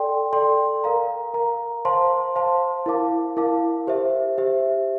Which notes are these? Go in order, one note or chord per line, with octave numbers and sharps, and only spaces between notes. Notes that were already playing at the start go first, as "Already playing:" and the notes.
Already playing: A4 D5 G5 C6
A4 D5 G5 C6
A#4 F5 A#5
A#4 F5 A#5
C5 F5 A5 C6
C5 F5 A5 C6
E4 A#4 F5 A5 D6
E4 A#4 F5 A5 D6
G4 C5 E5
G4 C5 E5